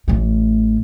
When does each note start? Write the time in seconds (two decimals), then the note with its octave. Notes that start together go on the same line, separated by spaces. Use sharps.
0.08 A1 A3